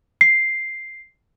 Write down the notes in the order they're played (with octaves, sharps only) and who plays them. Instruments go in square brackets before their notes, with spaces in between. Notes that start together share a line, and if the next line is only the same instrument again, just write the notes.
[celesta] C7